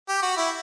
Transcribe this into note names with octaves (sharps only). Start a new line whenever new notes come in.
G4
F#4
E4